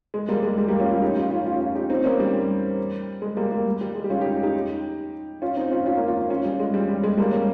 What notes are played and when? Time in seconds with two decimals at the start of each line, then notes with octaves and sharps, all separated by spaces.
0.14 G#3
0.29 G3 A#3
0.43 G#3
0.58 G3
0.68 G3 A#3
0.80 C#4 F4
0.91 C#4 F4
1.02 D#4 G4
1.17 C#4 F4
1.31 C#4 F4
1.45 C#4 F4
1.60 C#4 F4
1.75 D#4 G4
1.90 C4 D#4
2.04 A#3 C#4
2.20 G3
3.22 G#3
3.37 G3 A#3
3.52 G3 A#3
3.81 G3
3.95 G#3
4.04 G4
4.10 C#4 F4
4.21 D#4 G4
4.43 D#4 G4
5.42 C#4 F4
5.57 C4 D#4
5.72 C#4 F4
5.86 C#4 F4
5.97 A#3 C#4
6.08 C#4 F4
6.30 C#4 F4
6.45 G3
6.59 G#3
6.74 G3
6.89 G3
7.04 G#3
7.17 G3 A#3
7.33 A#3 C#4